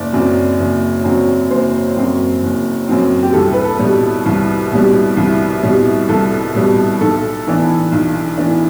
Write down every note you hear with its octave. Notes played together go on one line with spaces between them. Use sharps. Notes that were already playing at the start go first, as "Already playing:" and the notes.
Already playing: F#1 D5
F#2 F#3 C4
F#1
F#2 F#3 C4
F#1 C5
F#2 F#3 C4
F#1
F#2 F#3 C4
G4
C2 A4
B4
A4
B2 G3
C2
B2 G3
C2
B2 G3
C2 A4
B2 G3
B1 A4
A2 E3 B3 D4
B1
A2 E3 B3 D4